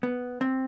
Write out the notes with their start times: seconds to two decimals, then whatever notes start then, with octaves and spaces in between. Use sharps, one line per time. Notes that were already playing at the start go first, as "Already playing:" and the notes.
0.03 B3
0.41 C4